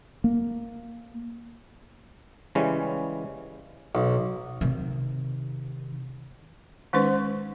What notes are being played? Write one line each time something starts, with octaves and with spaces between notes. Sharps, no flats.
A#3
C#3 E3 G3 G#3 C#4
B1
C3 D#3
D#3 G#3 C#4 D#4 B4 C5